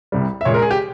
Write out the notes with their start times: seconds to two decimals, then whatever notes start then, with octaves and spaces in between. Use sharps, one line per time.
0.12 C2 C3 G3
0.41 E5
0.45 A#2 G#3 C#5
0.54 A#4
0.62 G#4
0.71 G4